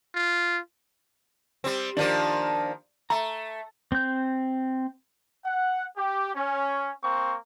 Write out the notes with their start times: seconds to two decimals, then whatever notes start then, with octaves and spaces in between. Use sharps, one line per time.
0.15 F4
1.64 G3 C4
1.97 D#3 F3 A#3 D4
3.10 A3 A#5
3.92 C4 G6
5.45 F#5
5.97 G4
6.35 C#4
7.03 A#3 C4 C#6